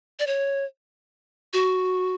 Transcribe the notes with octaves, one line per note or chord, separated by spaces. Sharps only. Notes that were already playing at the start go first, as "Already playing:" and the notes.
D5
C#5
F#4